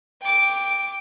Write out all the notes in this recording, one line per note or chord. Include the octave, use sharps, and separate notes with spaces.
G5 D6